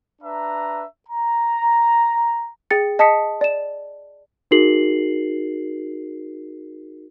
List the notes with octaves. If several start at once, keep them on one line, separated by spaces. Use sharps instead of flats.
D4 B4 E5 A#5
A#5
G#4 G5 A6 C#7
D#5 A5 D#6 B6 C#7
D5 E7
D#4 F#4 G#4 A#4 C7 F#7